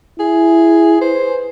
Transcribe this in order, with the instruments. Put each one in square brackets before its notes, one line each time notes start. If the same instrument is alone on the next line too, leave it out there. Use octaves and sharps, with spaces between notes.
[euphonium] E4 [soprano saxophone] G#4
[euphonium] B4 [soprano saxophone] C5